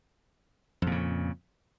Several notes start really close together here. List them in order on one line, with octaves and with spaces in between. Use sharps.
F2 A#2 C#3